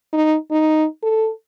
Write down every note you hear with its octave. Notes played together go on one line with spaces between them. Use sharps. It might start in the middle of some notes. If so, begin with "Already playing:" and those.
D#4
D#4
A4